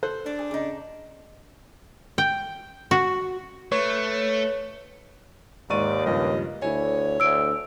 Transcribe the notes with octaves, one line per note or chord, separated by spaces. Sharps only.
A4 C5 F#6
D4 D5
G#4
C#3 D#4 D6
G5
F#4
A3 B4 C#5
D#2 G#2 D5 C#6 D#7
C#2 G2 F3 D#5
D2 E4 C#5 G#5
D2 E6 D7